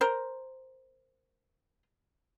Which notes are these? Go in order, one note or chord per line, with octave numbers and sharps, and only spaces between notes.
A#4 C5